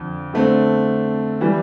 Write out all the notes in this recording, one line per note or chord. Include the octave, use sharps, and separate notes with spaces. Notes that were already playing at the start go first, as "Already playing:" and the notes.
Already playing: F2 D3
D3 A3 C4
E3 G3